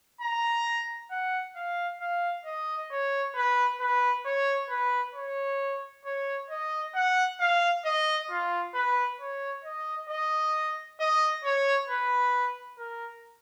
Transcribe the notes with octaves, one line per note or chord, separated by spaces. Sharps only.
A#5
F#5
F5
F5
D#5
C#5
B4
B4
C#5
B4
C#5
C#5
D#5
F#5
F5
D#5
F4
B4
C#5
D#5
D#5
D#5
C#5
B4
A#4